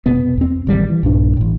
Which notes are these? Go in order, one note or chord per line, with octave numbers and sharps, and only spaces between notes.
F1 B2 B3
E2 C4
A1 D#3 G3
E3
A#1 G2 D4
A1 A2